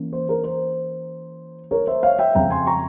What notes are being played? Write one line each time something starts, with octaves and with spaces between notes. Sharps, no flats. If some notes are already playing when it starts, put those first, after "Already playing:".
Already playing: E3 A#3 C#4
C5
A#4
C5
A#4 C#5
C5 E5
C#5 F5
E5 G5
F2 C#3 F3 G#3 G5 A#5
G#5 C6
A#5 C#6